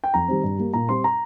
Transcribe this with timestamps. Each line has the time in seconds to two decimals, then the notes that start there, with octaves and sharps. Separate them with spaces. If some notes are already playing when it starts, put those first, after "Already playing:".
0.04 G5
0.14 F2 A#5
0.28 D#3 G3 C4
0.44 G2
0.58 G3 A#3
0.74 A#2 A#5
0.89 G3 C4 C6
1.04 A#5